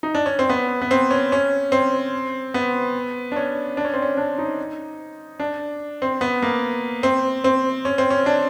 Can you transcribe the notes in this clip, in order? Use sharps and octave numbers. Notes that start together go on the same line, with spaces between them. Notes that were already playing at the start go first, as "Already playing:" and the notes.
D#4
D4
C#4
C4
B3
B3
C4
C#4
C#4
C4
B3
D4
C#4
D4
C#4
C4
C#4
D4
D#4
D4
C4
B3
A#3
C4
C4
C#4
C4
C#4
D4